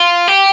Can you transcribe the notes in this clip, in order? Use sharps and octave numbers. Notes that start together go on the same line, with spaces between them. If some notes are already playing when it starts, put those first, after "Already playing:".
Already playing: F4
G4